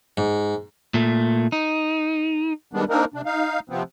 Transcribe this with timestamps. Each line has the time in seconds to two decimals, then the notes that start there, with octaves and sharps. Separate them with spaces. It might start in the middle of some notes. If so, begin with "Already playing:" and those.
0.17 G#2
0.94 A#2 A3
1.52 D#4
2.73 D#3 G3 G#3 B3 D4
2.89 A#3 C4 D4 D#4 A#4
3.14 C3 D4
3.25 D#4 F5
3.70 C3 F3 B3 C4